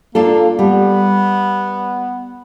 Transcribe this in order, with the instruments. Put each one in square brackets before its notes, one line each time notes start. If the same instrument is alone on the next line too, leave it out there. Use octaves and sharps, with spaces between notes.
[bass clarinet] A#3 [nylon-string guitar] D4 F4 A4
[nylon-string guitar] G3 [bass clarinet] B3